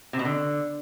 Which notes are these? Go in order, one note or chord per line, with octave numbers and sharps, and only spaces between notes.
C3
B2
D3